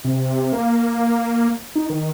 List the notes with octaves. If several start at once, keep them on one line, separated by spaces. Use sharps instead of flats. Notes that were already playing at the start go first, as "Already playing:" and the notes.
C3
A#3
D#4
D#3